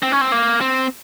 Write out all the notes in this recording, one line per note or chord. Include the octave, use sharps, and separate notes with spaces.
C4
C#4
C4
A#3
C4